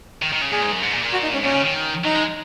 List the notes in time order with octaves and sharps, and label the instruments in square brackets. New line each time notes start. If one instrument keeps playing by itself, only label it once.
[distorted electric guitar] D#3
D#3
C#3
[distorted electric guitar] A#2 [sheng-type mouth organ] G#4
[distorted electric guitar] G#2
F#2
G#2
A#2
A#2
[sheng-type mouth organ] F#4
D#4
[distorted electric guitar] G#2 [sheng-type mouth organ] C#4
[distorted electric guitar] A#2 [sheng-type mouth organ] C#4
[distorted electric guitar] C#3
D#3
[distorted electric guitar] F#3 [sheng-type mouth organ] D#4
[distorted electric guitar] G#3